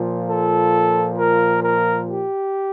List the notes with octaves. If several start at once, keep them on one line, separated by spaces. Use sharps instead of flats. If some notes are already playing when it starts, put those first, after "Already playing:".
Already playing: A#2 F3
A4
A#4
A#4
G4